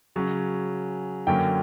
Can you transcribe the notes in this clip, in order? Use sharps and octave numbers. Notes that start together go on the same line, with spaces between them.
C#3 F#3 C#4
F#2 D3 F#3 A#3 C#4 G5